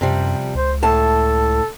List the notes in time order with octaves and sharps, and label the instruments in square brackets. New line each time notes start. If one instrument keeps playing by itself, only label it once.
[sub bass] F#2 [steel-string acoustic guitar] C3 F3 G3
[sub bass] C#2 [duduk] C5
[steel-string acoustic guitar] A2 A5 [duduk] A4